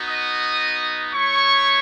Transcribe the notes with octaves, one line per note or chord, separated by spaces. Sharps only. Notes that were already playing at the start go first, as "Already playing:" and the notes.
Already playing: B3 D#4 F#4
D#5 D#6
A3 E4 C#5 C#6